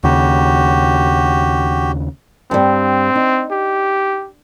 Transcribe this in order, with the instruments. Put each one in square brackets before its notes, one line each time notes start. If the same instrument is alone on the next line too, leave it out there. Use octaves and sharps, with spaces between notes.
[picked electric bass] D#2 C#3 [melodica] F#4 G4
[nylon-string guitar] G2 G3 [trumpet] C4
[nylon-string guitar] D#4
[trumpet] G4